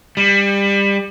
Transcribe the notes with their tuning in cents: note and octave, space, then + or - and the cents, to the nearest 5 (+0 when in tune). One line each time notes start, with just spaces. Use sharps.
G3 +25